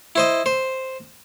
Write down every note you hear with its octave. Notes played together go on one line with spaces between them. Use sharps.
E4 C5 D#5
C5